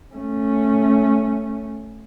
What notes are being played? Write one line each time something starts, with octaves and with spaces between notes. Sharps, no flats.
A3 C#4